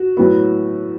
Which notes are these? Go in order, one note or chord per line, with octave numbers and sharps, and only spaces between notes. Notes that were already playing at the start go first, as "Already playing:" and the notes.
Already playing: F#4
A2 F#3 B3